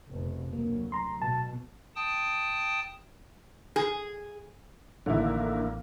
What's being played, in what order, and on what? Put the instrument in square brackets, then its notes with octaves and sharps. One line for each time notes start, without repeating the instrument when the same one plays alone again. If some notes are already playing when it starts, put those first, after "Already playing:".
[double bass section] F1 B2
[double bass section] D2 F#3 [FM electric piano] A#3
[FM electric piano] A#5 C6
[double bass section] B2 [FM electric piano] A5
[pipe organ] G5 A5 D#6
[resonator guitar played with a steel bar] G#4
[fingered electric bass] A1 [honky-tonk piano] D3 D#3 E4 [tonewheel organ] A#3